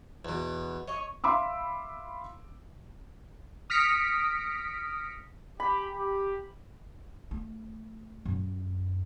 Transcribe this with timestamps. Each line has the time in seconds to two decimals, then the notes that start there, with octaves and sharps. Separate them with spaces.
0.25 E2 B2
0.87 C#5 D#5 C#6
1.24 E5 F5 B5 C6 D6 E6
3.70 D#6 F6 A#6 B6 C#7 D7
5.60 G4 B5
5.96 G4
7.31 A3
8.25 F#2